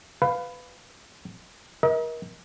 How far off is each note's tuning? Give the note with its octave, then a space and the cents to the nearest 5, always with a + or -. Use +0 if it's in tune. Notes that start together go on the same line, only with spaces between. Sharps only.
B4 +15 F5 +10
A#4 +30 D#5 +40